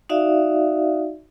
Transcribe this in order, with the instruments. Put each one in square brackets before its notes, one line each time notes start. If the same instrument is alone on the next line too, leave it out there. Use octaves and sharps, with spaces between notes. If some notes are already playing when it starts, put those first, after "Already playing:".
[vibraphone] D#4 F#4 D5 E5 F5